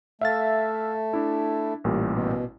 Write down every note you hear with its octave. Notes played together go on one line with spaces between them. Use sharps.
A3 E5 F5 A6
D4 E4
A1 A#2 G3
B2